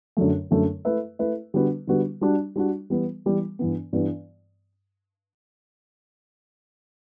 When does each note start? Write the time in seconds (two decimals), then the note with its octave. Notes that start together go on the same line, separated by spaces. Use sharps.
0.17 F#2 D3 F#3 A3
0.51 F#2 D3 F#3 A3
0.85 A3 E4 B4 E5
1.19 A3 E4 B4 E5
1.54 D3 G3 B3 F#4 B4
1.87 D3 G3 B3 F#4 B4
2.21 G3 D4 F#4
2.56 G3 D4 F#4
2.90 E3 G3 B3
3.25 E3 G3 B3
3.59 G2 E3 B3
3.93 G2 E3 B3